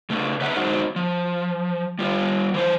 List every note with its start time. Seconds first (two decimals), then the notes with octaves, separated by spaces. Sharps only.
0.10 C#3 A3
0.41 B4 C#5 E5 F#5
0.56 F#3 G#3 D#4 F#4 C5
0.96 F3
1.99 G3 F4
2.54 E3 C5